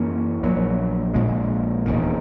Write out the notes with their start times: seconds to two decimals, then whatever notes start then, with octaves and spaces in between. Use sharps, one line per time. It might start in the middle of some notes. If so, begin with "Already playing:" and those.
Already playing: F#2 E3 A#3 C#4
0.43 A#1 A#2 F#3
1.14 A#1 A#2 G#3
1.86 E1 D#2 D#3